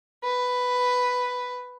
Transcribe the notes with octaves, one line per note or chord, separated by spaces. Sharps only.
B4